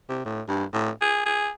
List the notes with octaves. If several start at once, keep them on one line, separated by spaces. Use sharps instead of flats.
C3
A2
G2
A2
G#4
G#4